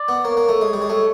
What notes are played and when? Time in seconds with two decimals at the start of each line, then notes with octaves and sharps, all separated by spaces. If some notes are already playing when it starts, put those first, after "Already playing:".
Already playing: D5
0.08 B3
0.25 A#3 C#5
0.37 A#3
0.49 A3
0.61 G#3
0.73 G3
0.82 G#3
0.89 A3